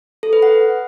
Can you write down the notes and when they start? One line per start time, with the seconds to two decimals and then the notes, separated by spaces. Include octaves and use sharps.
0.23 A4
0.33 B4
0.43 F#5